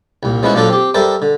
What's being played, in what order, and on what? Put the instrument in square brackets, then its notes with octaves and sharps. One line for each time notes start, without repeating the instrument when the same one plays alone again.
[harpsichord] C2 A#2
F3 G#3 B3 C#4 E4 F#4
A#2 F3 F#3 D4 F4 A4
C4 G4
G3 A4 A#4 C5 E5
D3